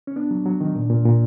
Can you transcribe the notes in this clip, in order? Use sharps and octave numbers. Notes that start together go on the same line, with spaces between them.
C#4
B3 D4
F#3
F#3
D#3
A#2
A#2
A#2